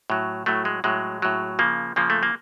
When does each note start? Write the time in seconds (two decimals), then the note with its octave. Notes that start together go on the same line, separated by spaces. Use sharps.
0.10 A2 F#3
0.46 A2 F#3 A3
0.65 G#3
0.84 A2 F#3 G#3
1.22 A2 F#3
1.59 C#3 F3 A#3
1.96 C#3 F3 A#3
2.10 A3
2.23 A#3